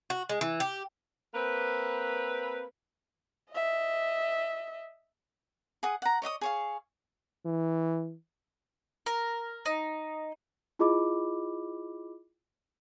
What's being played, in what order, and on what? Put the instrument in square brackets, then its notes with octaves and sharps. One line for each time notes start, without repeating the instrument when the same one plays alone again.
[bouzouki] F#4
G#3
E3
G4
[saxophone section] A#3 C4 B4
[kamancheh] D#5 E5
[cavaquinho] G#4 F#5 D#6
F#5 A#5
C#5 D#5 E5 D#6
G#4 C#5 F5
[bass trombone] E3
[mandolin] A#4
D#4
[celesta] E4 F4 G#4 D#5 B5 D6